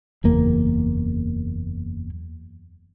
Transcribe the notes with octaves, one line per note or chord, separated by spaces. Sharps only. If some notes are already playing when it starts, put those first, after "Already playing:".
F#1 E2 A#3